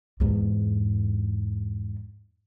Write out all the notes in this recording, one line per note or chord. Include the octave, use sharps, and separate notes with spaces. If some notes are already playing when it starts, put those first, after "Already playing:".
E2 G#2